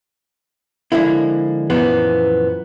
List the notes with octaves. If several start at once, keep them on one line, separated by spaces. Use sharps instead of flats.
D3 F3 G#3 A#3 E4
F#2 A#2 E3 F3 A#3 B3